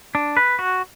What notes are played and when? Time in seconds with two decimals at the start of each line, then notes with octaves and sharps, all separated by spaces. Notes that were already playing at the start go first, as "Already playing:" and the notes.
0.15 D4
0.37 B4
0.59 F#4